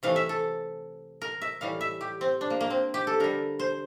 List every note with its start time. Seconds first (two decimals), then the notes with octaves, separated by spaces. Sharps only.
0.03 C3 E3 A3 F5
0.16 E5
0.29 A4
1.22 A#4
1.42 E5
1.61 A2 E3 G3 F5
1.81 E5
2.01 G4
2.21 C4
2.41 D4
2.50 A#3
2.61 A#3
2.70 C4
2.94 G4
3.07 A4
3.20 D3 G3 A#4
3.59 C5